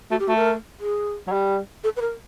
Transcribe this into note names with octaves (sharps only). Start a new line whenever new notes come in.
A3 F#4
G4
A3 F#4
A#4
G#4
F#3
G3
A4
B4
A#4